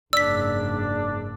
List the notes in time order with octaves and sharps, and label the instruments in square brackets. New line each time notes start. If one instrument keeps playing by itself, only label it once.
[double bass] F#1 G#2 [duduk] D4 [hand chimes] D5 [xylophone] E6 B6